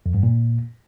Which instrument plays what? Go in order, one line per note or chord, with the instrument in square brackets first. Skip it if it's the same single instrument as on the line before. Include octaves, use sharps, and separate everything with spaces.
[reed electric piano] F2
G2
A#2